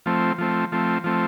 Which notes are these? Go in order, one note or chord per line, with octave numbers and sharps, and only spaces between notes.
F3 A3 C4
F3 A3 C4
F3 A3 C4
F3 A3 C4